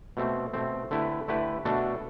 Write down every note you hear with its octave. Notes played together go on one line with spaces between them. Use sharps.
B2 A3 C4
B2 A3 C4
D3 A3 E4 G4 B4
D3 A3 E4 G4 B4
B2 A3 D4 F#4 A4